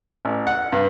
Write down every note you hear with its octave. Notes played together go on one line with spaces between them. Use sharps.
A1
F#5
G2